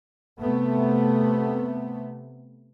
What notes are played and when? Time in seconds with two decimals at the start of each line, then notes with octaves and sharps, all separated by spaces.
0.40 C3 A3 B3